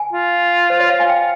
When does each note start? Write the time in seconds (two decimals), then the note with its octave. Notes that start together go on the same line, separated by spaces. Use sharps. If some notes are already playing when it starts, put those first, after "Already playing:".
Already playing: G#5
0.13 F4
0.70 C5
0.80 C#5
0.89 F5
1.00 G#5
1.09 G5